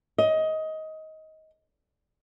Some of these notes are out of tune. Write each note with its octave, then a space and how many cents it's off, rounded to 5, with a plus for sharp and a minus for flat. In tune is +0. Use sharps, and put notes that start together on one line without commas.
D#5 +20